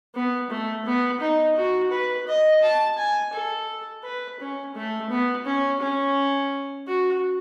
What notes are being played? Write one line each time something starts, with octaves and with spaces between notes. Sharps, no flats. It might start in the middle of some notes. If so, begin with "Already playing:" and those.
B3
A3
B3
D#4
F#4
B4
D#5
A5
G#5
A4
B4
C#4
A3
B3
C#4
C#4
F#4